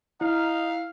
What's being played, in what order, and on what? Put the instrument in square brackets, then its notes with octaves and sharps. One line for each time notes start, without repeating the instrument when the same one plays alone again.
[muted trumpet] D#4 [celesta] E4 [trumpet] F5